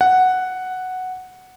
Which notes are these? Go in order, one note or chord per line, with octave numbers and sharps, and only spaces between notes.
F#5